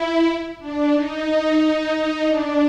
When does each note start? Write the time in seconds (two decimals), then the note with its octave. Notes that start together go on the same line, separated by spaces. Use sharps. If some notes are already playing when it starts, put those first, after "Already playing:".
Already playing: E4
0.59 D4
0.92 D#4
1.59 D#4
2.27 D4